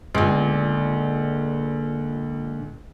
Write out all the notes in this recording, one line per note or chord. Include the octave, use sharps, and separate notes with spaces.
C#2 A#2 D3